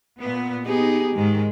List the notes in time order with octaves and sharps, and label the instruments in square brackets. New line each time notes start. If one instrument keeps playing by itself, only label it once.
[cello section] A#2 B3
[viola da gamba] B3 G4 G#4 [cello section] D#4
[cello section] G#2 D#3 [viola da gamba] G#3